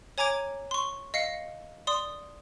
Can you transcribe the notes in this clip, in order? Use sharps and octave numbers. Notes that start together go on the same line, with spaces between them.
C#5 G#5 A#5 D6 G#6 D7
C6 C#6
D#5 F5 C7 C#7
D5 C6 D#6